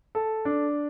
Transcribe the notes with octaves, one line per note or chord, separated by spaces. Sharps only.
A4
D4